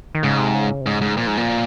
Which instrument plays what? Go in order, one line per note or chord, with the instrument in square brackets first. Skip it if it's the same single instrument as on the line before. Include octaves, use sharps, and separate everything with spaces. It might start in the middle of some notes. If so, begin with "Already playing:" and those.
[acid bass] D#3
[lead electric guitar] G#2 [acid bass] C#3
[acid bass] C3
C#3
C3
[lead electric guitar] G#2 [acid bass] C#3
[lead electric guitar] G#2
[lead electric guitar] A#2 [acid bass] F3
[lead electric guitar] G#2
A#2